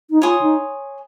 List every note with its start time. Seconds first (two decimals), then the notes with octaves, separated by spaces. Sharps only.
0.10 D#4
0.22 F4 C#5 G#5 C6 D#6
0.41 D#4